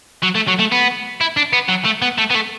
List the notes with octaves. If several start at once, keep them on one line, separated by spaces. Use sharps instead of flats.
F#3
A3
F#3
A3
B3
E4
D4
B3
F#3
A3
B3
A3
B3
A3